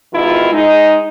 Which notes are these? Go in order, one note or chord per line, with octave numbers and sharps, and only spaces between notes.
G#2 B2 D#3 E4 F4
G#3 D#4